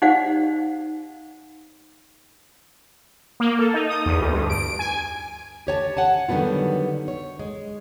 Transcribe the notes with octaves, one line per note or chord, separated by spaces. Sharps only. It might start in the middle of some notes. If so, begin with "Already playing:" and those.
D#4 G4 C5 D5 F5 F#5
A#3
A4
D#4
D#6
E2
D2
G2
D7
G#5
G4 C#5 G#5 A5
F#5 G#5 A5
D3 D#3 F#3 G3 B3 F4
C#5
G#3